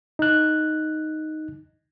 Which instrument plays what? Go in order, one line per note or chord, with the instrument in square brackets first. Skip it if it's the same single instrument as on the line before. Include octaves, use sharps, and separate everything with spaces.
[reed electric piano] D#4 F#6